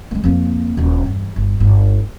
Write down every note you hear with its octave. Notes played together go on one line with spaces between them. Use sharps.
G#3 A#3
F2 A#3
D#1 A#1
E2 G2
G1
G1